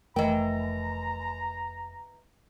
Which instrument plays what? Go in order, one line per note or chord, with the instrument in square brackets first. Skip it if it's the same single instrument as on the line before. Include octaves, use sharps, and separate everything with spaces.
[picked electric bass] F1 A3 [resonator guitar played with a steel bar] E3 G5 [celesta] A#4 D#5 [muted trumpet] A#5